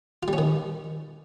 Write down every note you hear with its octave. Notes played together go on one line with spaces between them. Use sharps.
F4
G3
C#4
D#3